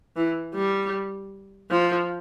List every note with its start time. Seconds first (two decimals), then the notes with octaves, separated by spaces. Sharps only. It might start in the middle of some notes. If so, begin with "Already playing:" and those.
0.16 E3
0.55 G3
1.71 F3